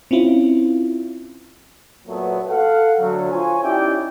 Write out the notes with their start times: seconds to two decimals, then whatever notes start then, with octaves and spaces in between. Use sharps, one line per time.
0.11 C4 C#4 E4 F4
2.07 A#2 F#3 A3 B3
2.48 A4 F5 F#5
2.99 D3 F#3 A3
3.31 F4 C5 C#5 G#5
3.63 C#4 D#4 E4 G4 D5 G5